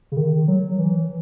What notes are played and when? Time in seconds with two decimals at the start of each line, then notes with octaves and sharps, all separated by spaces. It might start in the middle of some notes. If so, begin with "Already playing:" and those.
0.12 C#3
0.17 D#3
0.48 F#3
0.78 E3